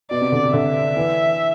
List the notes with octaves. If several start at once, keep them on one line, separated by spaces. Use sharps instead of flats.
B2 D5
C3
D3
C3
D3 E5
E3